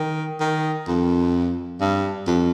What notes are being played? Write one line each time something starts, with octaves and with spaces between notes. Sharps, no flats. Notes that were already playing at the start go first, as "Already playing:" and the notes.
Already playing: D#3
D#3
F2
G2
F2